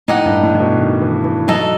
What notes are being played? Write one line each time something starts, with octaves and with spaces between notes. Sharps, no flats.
A2 D#4 G4 D#5 F#5
G2
A2
A2
B2
D#3
E3
E3
F#3 D#4 A4 D#5